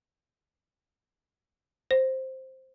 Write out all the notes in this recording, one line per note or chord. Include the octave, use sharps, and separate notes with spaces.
C5